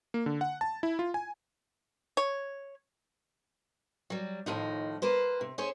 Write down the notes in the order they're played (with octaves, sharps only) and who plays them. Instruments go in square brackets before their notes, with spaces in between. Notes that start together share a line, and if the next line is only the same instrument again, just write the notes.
[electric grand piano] A#3
D3
F#5
A5
E4
F4
G#5
[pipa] C#5
[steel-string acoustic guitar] F#3 G3
D#2 A2 F3 D#4
A#3 B4 C5
C3
C#4 G#4 C5 C#5